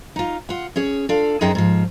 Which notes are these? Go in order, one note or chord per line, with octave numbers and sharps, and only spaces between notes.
D#4 F4
F4 F#5
C#4 G#4 C#5
D4 F4 A4 F5
F#2 D#4 G#4 C5 D#5 G5
G#2 F3